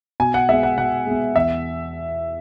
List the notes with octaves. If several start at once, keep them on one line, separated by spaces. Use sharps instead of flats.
B2 G#5
F#5
G#3 B3 E5
F#5
B2 F#5
G#3 B3
E2 E5